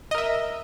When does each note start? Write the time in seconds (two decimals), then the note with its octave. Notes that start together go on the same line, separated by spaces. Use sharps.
0.11 D#5
0.15 A#4
0.18 E5